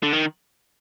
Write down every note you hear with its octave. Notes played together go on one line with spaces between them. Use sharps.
D3
D#3